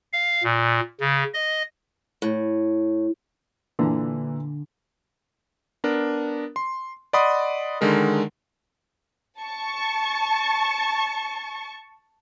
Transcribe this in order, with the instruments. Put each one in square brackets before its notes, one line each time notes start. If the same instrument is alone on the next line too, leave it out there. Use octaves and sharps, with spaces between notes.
[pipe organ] F5
A#2
C#3
D#5
[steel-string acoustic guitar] A2
[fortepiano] A#2 E3 [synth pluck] D3
[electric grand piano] B3 D4 A#4
C6
D5 D#5 F#5 B5 C6 D#6
D3 D#3 G#3 A#4
[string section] A5 C#6